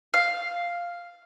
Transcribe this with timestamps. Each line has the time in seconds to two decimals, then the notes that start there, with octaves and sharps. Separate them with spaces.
0.14 F5